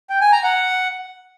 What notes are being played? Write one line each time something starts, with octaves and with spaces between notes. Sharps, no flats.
G5
G#5
A#5
F#5